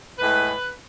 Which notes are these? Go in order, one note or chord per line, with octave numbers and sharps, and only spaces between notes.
A2 G#3 B4